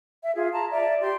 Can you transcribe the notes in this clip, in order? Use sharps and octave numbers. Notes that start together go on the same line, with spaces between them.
E5
F4 G#4
A5 A#5
D5 E5
G4 C6